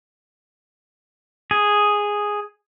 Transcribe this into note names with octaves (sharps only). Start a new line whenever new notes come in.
G#4